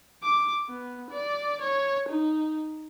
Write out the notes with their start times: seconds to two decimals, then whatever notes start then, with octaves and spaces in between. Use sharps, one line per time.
0.23 D6
0.68 B3
1.11 D5
1.61 C#5
2.08 D#4